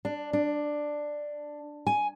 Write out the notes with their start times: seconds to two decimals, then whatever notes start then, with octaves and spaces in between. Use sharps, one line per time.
0.05 D4
0.33 D4
1.87 G#5